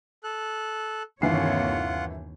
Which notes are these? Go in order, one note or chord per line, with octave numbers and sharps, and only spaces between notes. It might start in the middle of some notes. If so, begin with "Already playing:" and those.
A4 F#6
G1 D#2 C3 E3 F4 C#5 F#5 C7